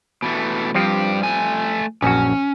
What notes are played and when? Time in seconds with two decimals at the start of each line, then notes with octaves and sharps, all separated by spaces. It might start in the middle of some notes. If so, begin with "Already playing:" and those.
0.22 B2 E3 A3
0.75 G2 F3 G3 C4 G4
1.23 A3 G#5
2.02 A#1 F#2 C#4 F#4